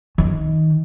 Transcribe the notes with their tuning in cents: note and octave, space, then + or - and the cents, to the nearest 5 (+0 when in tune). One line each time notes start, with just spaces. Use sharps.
D#3 +20